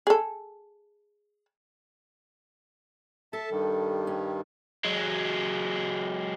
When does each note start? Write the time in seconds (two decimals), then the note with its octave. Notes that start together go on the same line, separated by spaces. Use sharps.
0.07 G#4 A4
3.33 A4 E5 A5
3.51 G2 D#3 G3
4.07 C#4
4.85 F#3 G#3